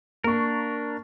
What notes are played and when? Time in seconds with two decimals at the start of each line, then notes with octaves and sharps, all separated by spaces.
0.24 A#3 D4 A#4 C#6